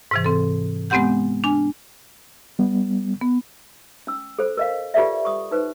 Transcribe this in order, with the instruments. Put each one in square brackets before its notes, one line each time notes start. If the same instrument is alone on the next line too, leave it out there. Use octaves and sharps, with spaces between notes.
[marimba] G#2 C3 E3
C4 A4
G#3 B3 C4 G4 F#5 G6
D4 G#5
[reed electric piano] G3 B3
[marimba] B3
[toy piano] C#4 E6
A4 C5
A#4 D#5 F5
F4 G4 A4 B4 D5 E5
C#6 D#6
D#4 B4 C5